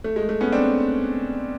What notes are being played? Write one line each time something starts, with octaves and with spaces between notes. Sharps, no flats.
A3
G#3
A3
B3 C#4
C4 D4